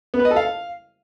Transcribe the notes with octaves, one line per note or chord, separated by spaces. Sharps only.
B3
B4
D#5
A4
F5